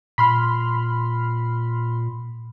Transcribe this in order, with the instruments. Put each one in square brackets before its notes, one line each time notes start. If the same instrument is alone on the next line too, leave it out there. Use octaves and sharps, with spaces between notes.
[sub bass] A#2 [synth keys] B5 C6 F6